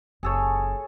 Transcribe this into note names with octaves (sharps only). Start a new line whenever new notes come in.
F#1 G#4 A4 C#5